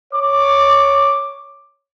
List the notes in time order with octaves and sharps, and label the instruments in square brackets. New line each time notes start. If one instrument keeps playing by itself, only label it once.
[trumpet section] C#5 D6